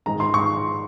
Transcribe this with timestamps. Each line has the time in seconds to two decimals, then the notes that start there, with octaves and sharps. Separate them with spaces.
0.06 G#2 D#3 G#3 A#5
0.20 C6
0.34 C#6